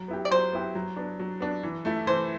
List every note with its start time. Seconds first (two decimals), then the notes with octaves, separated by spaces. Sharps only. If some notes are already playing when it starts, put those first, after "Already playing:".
Already playing: F#3
0.08 B3 E4 G4
0.25 D5
0.31 F#3 C5
0.52 B3 E4 G4
0.75 F#3
0.96 B3 D4
1.19 F#3
1.40 B3 D4
1.63 E3
1.85 A3 E4
2.07 E3 C5